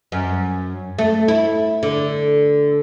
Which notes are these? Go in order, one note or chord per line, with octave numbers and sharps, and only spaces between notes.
F#2
A3
E4
D3